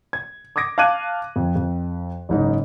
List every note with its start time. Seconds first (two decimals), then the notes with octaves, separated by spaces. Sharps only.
0.13 G#6
0.56 D6 D#6 G#6 A#6 D7
0.78 F5 A5 D6 F#6 G#6 D#7
1.36 F2
1.56 F2
2.29 F#1 G#2 D#4